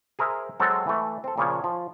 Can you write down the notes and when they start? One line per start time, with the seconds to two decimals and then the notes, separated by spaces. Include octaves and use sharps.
0.19 G#4 A#4 C5 E5
0.60 F#3 G#3 C4 F#4 A4
0.87 E3 A3
1.24 C4 A4
1.38 A#2 C#3 F3 C#5
1.64 F3